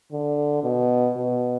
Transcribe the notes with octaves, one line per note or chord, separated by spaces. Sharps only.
D3
B2
B2